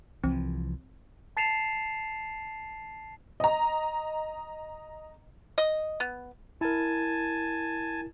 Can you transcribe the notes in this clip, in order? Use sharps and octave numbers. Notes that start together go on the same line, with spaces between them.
C2 E3 F3 C4
A5 A6 C7 C#7 E7 F7
D#5 A#5
D#5
B3
E4 A#4 G#5 A5